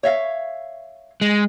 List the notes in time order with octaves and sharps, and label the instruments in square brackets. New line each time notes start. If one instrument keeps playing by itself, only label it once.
[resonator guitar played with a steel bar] C#5 E5 F5
[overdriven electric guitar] G#3